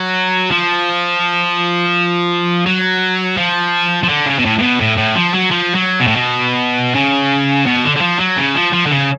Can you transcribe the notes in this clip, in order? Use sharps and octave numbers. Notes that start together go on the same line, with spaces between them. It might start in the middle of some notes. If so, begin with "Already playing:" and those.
Already playing: F#3
F3
F#3
F3
F3
D3
C#3
B2
A2
A2
B2
A2
A2
F3
F#3
F3
F#3
B2
A2
B2
C#3
B2
D3
D3
F3
F#3
C#3
F3
F3
D3
C#3